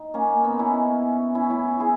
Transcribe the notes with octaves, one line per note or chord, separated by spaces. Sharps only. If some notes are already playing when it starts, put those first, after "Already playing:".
Already playing: D#4
A#3 C#4
B3 D#4
C#4 E4
C#4 E4
C#4 E4
E4 G#4